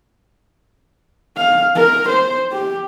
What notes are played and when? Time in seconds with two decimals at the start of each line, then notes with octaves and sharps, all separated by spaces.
1.37 F5
1.75 A#4
2.09 C5
2.52 G4